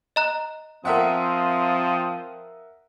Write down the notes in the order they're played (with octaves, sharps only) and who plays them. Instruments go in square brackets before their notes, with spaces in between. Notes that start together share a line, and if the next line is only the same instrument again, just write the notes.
[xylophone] D#5 A#5 F#6
[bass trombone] F3 [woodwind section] C4 D#6 [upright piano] A#4 E5 F#5